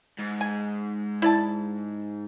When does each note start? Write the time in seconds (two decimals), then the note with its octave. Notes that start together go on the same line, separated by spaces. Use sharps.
0.19 G#2
0.41 G#5
1.22 E4 D5 A5